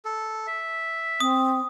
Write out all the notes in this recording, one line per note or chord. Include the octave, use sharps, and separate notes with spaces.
A4
E5
C4 D#6